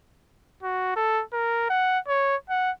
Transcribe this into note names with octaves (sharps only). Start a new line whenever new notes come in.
F#4
A4
A#4
F#5
C#5
F#5